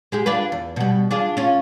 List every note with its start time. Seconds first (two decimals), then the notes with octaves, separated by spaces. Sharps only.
0.12 G#3 G4 G#4
0.26 D4 F4 B4
0.52 E2
0.76 B2 G3
1.11 D4 F4 G#4
1.37 C#4 F4